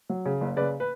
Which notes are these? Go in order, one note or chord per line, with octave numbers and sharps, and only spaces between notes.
F#3
C#3
F#1
C#3 B4 D5
B4